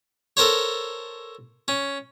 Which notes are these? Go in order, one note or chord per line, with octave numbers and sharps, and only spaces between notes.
A4 A#4 C5 C#5
C#4